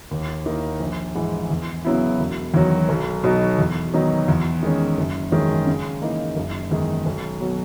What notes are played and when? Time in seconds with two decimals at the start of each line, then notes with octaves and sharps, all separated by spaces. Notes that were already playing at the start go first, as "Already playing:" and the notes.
0.11 D#2
0.46 D#3 A#3 E4
0.80 A#1
1.15 G#2 E3 G#3
1.50 E2
1.85 C#3 F#3 B3 E4
2.20 E1
2.54 E2 D#3 F#3
2.89 B1
3.24 B2 F#3 B3 D#4
3.59 E2
3.94 D#3 F#3 B3 D#4
4.28 E2
4.63 D#3 G#3 C#4
4.98 F#1
5.32 E2 D#3 G#3 C#4
5.67 C#3
6.02 E3 A#3 D#4
6.36 F#1
6.71 E2 D#3 G#3
7.06 B1
7.41 B2 F#3